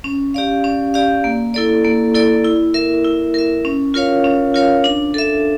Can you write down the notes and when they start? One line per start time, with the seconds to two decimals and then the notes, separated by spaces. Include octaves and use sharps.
0.04 C#4
0.34 G4 D5 F5
0.64 C#4
0.94 G4 D5 F5
1.24 A#3
1.54 E4 A4 D5
1.85 A#3
2.14 E4 A4 D5
2.45 E4
2.74 A#4 E5
3.04 E4
3.34 A#4 E5
3.65 C#4
3.94 F4 A#4 C#5 F5
4.24 C#4
4.54 F4 A#4 C#5 F5
4.84 D4
5.14 A4 E5